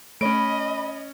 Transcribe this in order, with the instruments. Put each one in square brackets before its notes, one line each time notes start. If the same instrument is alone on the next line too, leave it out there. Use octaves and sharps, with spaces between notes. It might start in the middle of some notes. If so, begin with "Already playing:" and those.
[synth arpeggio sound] A3 C#5 [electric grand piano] C#4 D7 [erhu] D#5 [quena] B5